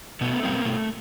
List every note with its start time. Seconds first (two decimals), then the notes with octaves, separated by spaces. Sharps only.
0.21 B2 A3 B3
0.43 G3 A#3 C4
0.65 B2 A3